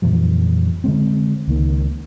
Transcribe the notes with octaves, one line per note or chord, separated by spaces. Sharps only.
F2 A#2 E3 F#3
D3 D#3 G#3 C4
C#2 D#3 A#3